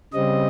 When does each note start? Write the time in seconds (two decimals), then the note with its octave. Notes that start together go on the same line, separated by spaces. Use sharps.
0.13 C#3 G3 C4 D#5